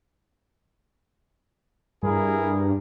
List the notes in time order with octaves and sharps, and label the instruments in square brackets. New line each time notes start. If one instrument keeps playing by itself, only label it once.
[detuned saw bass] G2 [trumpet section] E4 G#4 A#4